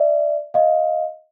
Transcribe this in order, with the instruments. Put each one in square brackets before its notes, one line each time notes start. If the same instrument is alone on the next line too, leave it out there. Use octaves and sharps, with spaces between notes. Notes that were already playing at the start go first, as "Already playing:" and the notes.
Already playing: [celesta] D5 E5
D#5 F5